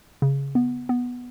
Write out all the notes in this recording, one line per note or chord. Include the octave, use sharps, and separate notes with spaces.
C#3
B3
B3